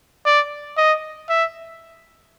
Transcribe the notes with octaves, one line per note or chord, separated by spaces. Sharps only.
D5
D#5
E5